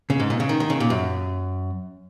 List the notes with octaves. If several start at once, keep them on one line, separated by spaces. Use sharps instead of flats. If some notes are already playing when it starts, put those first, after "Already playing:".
C#3
G#2
A#2
C#3
D#3
D#3
C#3
A#2
F#2